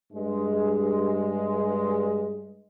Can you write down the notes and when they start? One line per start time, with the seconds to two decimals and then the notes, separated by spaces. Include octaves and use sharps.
0.13 G2 G#3